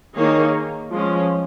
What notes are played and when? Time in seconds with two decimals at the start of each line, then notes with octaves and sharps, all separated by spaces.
0.16 D#3 A#3 D#4 G#4 C#5
0.91 F3 G#3 C#4